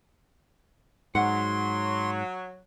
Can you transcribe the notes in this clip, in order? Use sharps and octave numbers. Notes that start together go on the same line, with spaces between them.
G#2 F#3 F#5 C6